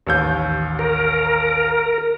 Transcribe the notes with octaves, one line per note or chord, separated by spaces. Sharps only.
A1 D#2 G6
A#4